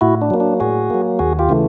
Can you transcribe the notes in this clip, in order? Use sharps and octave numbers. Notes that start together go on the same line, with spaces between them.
A2 E4 F#4
D4
F#3 A#3
D4
A2 F#4 G#4
F#3 A#3
D#2 F#4 G#4
F4 G4
C#3 E3 A3